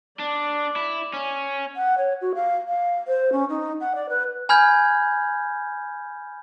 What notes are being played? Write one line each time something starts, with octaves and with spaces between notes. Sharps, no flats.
D4 D5
E4
C#4
F#5
C#5
F#4
F5
F5
C5
C#4
D#4
F#5
D5
B4
G#5 B5 F6 G6 G#6